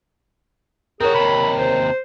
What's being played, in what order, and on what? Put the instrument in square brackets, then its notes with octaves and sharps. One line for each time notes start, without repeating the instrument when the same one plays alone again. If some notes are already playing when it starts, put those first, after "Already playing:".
[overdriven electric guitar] C4 F#4 [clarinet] G#4 [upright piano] A#4 C#5
[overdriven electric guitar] D#2 C3 [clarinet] B5
[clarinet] C5